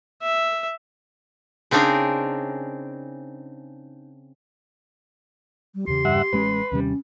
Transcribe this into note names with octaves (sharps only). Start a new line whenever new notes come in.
E5
C#3 C4 D4 D#4 G#4 A#4
G3
E2 C#3 G4 C6
G2 E5 F#5
A1 G#3 C#4 B4
D#2 C3 G3 C#4